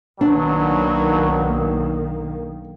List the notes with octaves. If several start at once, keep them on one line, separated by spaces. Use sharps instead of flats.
B1 B2 D#3 F#3 A#3 D4